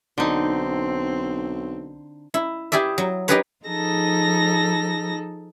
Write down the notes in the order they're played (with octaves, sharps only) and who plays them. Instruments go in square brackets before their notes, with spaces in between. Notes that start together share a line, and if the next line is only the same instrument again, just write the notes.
[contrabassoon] B1 [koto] D3 D#4 [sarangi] C4
[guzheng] E4
E4 G4 G#4 D5 E5
F#3
D#4 G4 G#4 A#4 B4 C#5
[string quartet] F3 D#4 G#4 A4 A#6